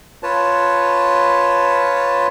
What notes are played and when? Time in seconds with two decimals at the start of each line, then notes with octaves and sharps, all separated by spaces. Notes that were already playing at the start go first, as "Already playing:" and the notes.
0.23 F4 B4 C#5 A5